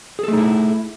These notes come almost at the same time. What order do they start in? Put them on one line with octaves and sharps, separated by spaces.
G#4 A4 A3 D#4 E4